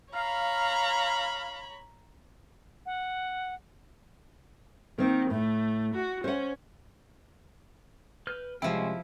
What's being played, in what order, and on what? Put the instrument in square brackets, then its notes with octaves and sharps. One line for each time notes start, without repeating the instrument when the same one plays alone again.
[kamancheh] C#5 B5 [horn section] F5 [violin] A#5
[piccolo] F#5
[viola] D#3 [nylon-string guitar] A#3 C4
[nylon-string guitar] A2 [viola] A3
[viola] F#4
[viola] C#4 [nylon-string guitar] C5 F#5
[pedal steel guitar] B4 F6 G6
[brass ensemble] C3 G3 G#3 [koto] F3 E4 [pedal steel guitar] C4 C#4 G5